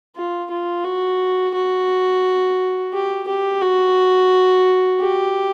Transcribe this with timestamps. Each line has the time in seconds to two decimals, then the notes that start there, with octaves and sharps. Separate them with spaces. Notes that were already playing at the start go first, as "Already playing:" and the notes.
0.16 F4
0.51 F4
0.85 F#4
1.55 F#4
2.93 G4
3.28 G4
3.62 F#4
5.00 G4